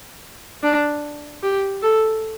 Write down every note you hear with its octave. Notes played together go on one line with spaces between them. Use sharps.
D4
G4
A4